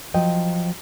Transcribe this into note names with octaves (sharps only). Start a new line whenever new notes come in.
F3 F#3 D#5 G5